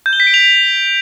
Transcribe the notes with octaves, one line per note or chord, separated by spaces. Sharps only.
G6
G7
B6
D7
F7